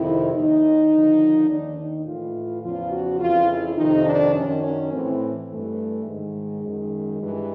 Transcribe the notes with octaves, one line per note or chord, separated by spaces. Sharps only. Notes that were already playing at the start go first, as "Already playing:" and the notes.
Already playing: F2 C3 D#3 E4
D#2 D#3 D#4
D#2 D3 F3
D#2 D#3 D4
D#4
A2 E3 F4
E2 C#3 F3 F4
F#4
F2 C#3 E3 F4
E4
F2 C3 D#3 D#4
D4
F#2 D#3 C#4
C#4
A2 E3 C4
G2 E3 A3
G#2 D#3 G#3
F#2 D#3
G2 E3